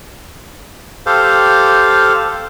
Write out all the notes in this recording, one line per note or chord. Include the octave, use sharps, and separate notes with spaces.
G4 A4 C5 F5